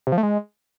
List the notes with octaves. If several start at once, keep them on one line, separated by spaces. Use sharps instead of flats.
C3
F3
A3
G#3